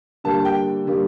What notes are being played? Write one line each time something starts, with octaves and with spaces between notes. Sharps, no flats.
D3 G3 A#3 A5
G5
D3 G3 A#3